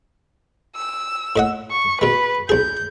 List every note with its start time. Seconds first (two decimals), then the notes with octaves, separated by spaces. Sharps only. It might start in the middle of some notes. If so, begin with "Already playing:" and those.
0.76 E6
1.36 A2 D#5 F#5
1.71 C#6
2.01 B2 G#3 B4
2.49 B1 G#4 G6